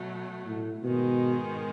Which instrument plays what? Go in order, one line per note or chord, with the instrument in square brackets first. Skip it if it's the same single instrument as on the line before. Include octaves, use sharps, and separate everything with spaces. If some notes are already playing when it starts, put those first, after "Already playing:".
Already playing: [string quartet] B2 F#3 A3
[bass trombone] A2
[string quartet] G#2 D#3 G#3 [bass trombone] B2